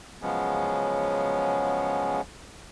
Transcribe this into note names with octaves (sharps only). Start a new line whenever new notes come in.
C#3 F3 F#3 G#3 B3 C#4